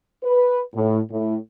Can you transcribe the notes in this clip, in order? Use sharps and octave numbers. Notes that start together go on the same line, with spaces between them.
B4
A2
A2